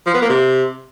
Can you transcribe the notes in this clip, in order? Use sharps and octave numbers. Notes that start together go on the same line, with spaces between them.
F3
B3
A#3
C3